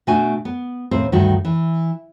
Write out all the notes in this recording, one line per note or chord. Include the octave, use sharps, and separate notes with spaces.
B2 A3 D4 F#4 G#5
B3
D#2 A2 C4 C5
D2 G2 D#3 F#4
E3